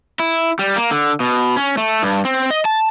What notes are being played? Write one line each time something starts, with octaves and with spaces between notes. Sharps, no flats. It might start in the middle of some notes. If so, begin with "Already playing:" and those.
E4
G3
A#3
D3
B2
C#4
A3
G2
C4
D#5
A5